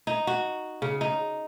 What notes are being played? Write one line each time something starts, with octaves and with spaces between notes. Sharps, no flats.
D#4
F#4
C#3
D#4